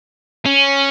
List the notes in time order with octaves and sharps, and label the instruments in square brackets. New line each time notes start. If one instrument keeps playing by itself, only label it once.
[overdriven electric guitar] C#4